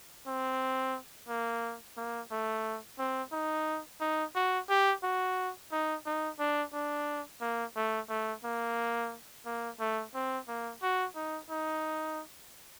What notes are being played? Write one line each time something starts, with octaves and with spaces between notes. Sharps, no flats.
C4
A#3
A#3
A3
C4
D#4
D#4
F#4
G4
F#4
D#4
D#4
D4
D4
A#3
A3
A3
A#3
A#3
A3
C4
A#3
F#4
D#4
D#4